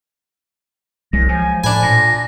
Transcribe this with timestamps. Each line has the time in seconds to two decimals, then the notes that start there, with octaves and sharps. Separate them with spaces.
1.13 C2 F#3 G#3 A#6
1.29 F3 G#5
1.64 A2 D4 G#5 B5
1.83 A#2 A#6